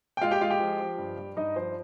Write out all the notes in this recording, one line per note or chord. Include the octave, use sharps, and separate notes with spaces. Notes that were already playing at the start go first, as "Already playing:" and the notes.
G5
G#3 F4 F5
G4 G5
G#3 F4 F5
G4 G5
F3
F3
G2
G2
G2 D#4 D#5
F3 C5